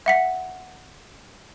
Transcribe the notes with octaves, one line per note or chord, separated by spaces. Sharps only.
E5 F#5 B6